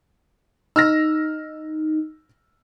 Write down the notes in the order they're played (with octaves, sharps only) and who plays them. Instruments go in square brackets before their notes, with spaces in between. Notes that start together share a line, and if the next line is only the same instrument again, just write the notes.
[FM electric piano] D#4 [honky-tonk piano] E6 F6 A#6